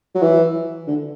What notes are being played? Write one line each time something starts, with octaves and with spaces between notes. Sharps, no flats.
F#3
E3
D3